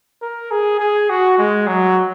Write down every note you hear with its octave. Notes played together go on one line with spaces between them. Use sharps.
A#4
G#4
G#4
F#4
G#3
F#3